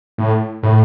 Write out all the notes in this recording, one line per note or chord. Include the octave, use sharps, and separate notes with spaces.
A2
A2